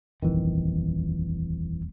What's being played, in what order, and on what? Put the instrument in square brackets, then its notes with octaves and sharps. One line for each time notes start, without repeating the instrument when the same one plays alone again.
[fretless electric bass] D#1 F2 D#3 [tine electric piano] G#1 E3